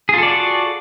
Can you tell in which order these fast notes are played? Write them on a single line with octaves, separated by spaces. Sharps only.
G#4 F4 A4 D5 F#4